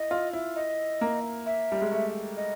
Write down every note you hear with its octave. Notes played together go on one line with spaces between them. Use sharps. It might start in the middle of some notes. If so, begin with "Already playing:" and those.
Already playing: E4 D#5
F4
E4
D#5
A#3
E5
G3
G#3
A3
D#5